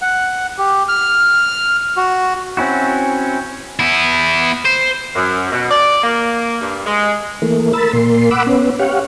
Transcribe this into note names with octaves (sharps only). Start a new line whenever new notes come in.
F#5
G4
F6
F#4
C4 C#4 E4 F#4
B3 E4
C5
F#2
B2
D5
A#3
G2
G#3
E3 A3 A#3
A#4 B5 E6 A6
A#2 A#3 C6
F#5 B5 D6 E6
B3 C#4
G4 C#5 F5 F#5